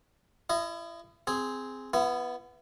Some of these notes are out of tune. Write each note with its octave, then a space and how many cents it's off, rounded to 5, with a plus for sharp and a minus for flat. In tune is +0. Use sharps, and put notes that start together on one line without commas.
E4 +35 D#5 -10
C4 -10 G#4 +0
B3 +0 E4 +35